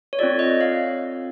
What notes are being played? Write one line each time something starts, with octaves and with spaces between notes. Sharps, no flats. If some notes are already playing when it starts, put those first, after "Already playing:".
C#5
C4 F4 A4 D5
D#5
F5